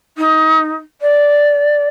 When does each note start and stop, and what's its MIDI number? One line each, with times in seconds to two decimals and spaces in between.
0.17 0.73 63
1.01 1.88 74